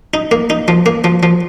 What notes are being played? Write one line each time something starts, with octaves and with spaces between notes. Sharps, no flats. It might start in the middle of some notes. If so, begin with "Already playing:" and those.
D#4
A#3
D#4
F3
A#3
F3
F3